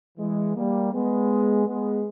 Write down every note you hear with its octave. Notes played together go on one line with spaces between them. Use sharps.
E3 G#3
G3 A#3
G#3 B3
G#3 B3